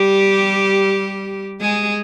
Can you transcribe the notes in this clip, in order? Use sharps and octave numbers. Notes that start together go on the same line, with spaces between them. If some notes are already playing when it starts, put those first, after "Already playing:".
Already playing: G3 G4
G#3 G#4